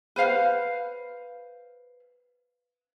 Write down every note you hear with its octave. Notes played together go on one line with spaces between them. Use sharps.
B4 C5 F5 F#5